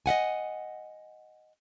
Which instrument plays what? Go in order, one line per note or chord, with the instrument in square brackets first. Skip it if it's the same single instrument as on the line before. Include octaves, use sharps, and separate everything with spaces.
[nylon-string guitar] D#5 E5 F#5 G#5